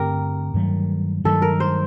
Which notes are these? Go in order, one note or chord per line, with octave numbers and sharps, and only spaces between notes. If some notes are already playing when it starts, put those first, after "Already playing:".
Already playing: G2 D3 A3 C4 G4 A#4
G2 D#3 F#3 A3
G2 D#3 F#3 A3 A4
A#4
C5